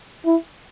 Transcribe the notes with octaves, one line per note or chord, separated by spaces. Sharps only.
E4